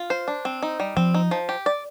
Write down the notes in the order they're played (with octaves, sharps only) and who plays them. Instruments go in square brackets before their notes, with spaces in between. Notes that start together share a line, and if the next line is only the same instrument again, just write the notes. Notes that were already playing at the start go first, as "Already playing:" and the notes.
Already playing: [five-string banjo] F4
C5
D4
C4
D#4
G3
[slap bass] F3 [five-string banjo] C4
[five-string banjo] D#4
F3
G4
D5